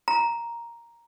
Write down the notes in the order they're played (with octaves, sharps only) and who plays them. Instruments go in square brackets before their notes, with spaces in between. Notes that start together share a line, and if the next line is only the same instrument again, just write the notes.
[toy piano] A#5